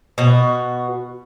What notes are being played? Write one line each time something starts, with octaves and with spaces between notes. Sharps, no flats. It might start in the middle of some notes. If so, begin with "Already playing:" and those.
B2 F#4